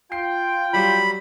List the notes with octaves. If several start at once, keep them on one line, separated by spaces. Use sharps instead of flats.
F4 G5 C7
F#3 G3 B5